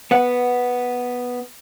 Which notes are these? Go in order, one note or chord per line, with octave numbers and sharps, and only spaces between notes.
B3 F#5